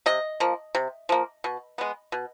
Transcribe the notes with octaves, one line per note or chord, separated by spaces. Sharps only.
C3 D#5
F3 A#3
C3
F3 A#3
B2
G#3 B3
B2